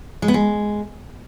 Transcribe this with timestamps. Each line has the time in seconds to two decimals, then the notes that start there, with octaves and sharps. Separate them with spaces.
0.22 G#3
0.28 B3
0.34 G#3